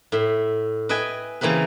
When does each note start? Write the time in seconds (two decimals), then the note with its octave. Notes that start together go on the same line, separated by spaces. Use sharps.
0.12 A2 E5
0.89 B4 D#5 E5 G5 G#5
1.41 C#3 E3 A#3 C4 B4